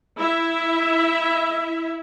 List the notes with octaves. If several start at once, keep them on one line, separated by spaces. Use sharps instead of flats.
E4 E5